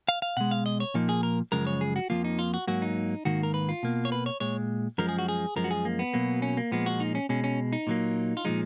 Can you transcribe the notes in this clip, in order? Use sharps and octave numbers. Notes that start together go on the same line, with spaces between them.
F5
F5
B2 G#3 F#5
F5
D#5
C#5
A#2 F3 A#3 D#4
G#4
A#4
F#2 C#3 F3 G#3 A#4
C#5
G#4
F#4
F2 F3 A#3 F4
D#4
F4
F#4
G#2 F#3 A#3 F#4
D#4
G#2 D#3 A#3 F#4
A#4
B4
F4
B2 A#3
C#5
B4
C#5
A#2 G#3 C#5
F#2 F3 G#3 A#4
G#4
F#4
G#4
F#2 F3 G#3 A#4
F#4
G#4
A#3
B3
B2 F#3 A#3
C#4
A#3
A#2 F3 G#3 B3
F#4
D#4
C#4
B2 G#3 C#4
C#4
D#4
A#2 F#3 A#3
F4
A#2 F3 G#3 D#4